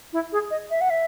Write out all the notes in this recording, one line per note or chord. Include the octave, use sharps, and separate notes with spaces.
E4
G#4
D#5
E5
F#5
E5